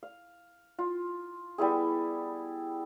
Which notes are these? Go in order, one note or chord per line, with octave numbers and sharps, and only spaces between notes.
F5
F4
G3 B3 E4 G#4